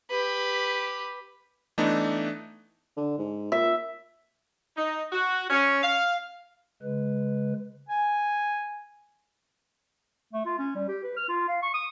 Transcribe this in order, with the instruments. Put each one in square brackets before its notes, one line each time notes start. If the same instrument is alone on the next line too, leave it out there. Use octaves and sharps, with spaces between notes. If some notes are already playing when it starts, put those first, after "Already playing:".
[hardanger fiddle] G4 B4
[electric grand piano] E3 A3 B3 D4 D#4
[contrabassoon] D3
G#2
[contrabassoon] A#2 [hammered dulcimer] E5
[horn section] D#4
F#4
C#4
F5
[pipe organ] C#3 G#3 B4
[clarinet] G#5
A3
F4
C#4
G3
G4
B4
F6
F4
F5
C#6
D#6